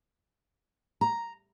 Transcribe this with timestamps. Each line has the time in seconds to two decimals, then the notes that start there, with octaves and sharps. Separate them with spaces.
1.01 A#5